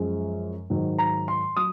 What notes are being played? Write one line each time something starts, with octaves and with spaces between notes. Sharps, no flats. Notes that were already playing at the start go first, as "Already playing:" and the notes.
Already playing: F#2 F3 G#3
G#2 D#3 F#3
A#5
C6
F#3 D#6